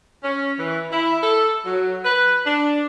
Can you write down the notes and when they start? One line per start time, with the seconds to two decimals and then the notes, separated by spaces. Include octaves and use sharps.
0.22 C#4
0.58 E3
0.91 E4
1.21 A4
1.64 F#3
2.04 B4
2.44 D4